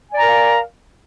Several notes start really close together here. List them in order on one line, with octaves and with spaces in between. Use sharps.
G#5 D5 A#5 A#4 F5